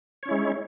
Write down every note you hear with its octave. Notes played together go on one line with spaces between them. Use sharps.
G#3 C#4 E4 C#5